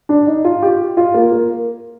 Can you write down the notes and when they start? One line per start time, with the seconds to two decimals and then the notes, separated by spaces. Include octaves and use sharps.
0.09 D4
0.27 D#4
0.45 F4
0.63 G4
0.97 F4
1.14 A#3
1.32 A#3